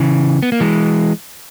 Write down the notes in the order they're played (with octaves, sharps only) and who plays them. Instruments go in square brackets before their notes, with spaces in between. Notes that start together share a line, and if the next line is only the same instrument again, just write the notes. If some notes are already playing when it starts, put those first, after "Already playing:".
Already playing: [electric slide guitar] C#3 E3
B3
A#3
E3 G#3